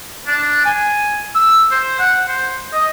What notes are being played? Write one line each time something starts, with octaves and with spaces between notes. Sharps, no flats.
D4
G#5
E6
C5
F#5
C5
D#5